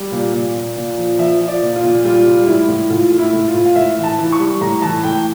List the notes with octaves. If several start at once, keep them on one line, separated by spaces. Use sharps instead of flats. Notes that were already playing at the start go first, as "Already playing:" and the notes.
Already playing: G3
A#2
A#2
A#2
A#2
F3
F3 E5
F3
D5
A#2
F4
A#2
G3 F4
G3
A2 E4
A2
A2 F4
A2
E4
A2
F4
A2
F5
A2 E5
E3
A5
E3
C#6
G3
A2 A#5
E3 A5
A2 G5